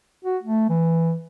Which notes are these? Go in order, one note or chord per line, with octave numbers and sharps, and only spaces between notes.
F#4
A3
E3